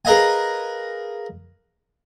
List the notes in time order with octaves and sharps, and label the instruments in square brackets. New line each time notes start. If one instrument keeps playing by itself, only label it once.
[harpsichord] G#4 A#4 B4 D#5 F5 G#5